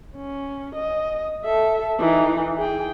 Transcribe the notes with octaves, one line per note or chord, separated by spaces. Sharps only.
C#4
D#5
A4 E5
E3 D#4
G#4 G5